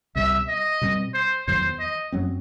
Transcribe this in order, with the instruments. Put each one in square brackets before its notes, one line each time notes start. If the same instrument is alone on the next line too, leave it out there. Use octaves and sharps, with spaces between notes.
[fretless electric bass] C2 B2 G3 [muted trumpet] E5
[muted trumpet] D#5
[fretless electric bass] B2 G3 C4
[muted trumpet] C5
[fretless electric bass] E2 D#3 F#3 B3 [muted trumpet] C5
[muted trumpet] D#5
[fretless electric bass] F#2 F#3 C4